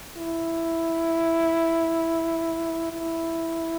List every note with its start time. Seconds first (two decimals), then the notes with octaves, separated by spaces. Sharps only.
0.17 E4
2.92 E4